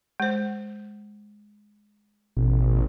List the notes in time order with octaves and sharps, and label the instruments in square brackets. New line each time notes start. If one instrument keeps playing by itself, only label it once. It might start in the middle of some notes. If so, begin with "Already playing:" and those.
[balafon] G#3 C5
[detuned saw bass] A1 [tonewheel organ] B2